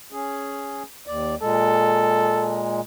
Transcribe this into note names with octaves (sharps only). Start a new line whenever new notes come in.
C#4 G#4
D#2 D5
A#2 G#3 A4